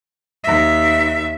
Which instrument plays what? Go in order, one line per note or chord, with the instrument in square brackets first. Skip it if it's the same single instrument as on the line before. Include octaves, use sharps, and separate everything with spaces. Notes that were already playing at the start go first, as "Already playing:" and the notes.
[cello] D#2 E5